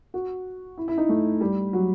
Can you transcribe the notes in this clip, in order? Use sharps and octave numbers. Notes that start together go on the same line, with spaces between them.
F#4
E4
E4
D#4
A3
G3
F#3